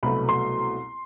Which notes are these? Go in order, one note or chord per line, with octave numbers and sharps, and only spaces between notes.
C2 B2 F#3 A3 B5
C6